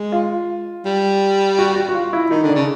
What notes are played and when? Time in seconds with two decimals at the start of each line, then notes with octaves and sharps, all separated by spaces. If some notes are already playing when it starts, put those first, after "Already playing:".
Already playing: G#3
0.12 F4
0.85 G3
1.59 F#4
1.76 F#4
1.89 F#4
1.94 F4
2.13 E4
2.30 D#3 D#4
2.43 D3
2.49 D4
2.55 C#3